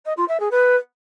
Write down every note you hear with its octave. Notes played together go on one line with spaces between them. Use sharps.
D#5
F4
E5
G#4
B4